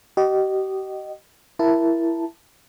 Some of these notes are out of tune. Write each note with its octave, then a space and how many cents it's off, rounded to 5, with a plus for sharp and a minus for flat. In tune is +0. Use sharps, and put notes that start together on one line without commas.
G4 -40 D#5 -15
E4 +15 A#4 +15 A5 +0